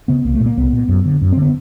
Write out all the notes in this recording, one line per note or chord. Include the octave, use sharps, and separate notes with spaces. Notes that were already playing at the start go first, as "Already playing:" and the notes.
C#3 B3
C2 A#3
A3
A#2
A#3
C2 B3
A#2
F#2
D3
F#2
C4
D3 B3